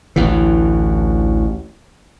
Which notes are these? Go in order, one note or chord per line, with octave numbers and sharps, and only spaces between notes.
A1 D2 E3